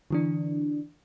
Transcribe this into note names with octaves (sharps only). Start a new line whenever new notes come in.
D3 E3 D4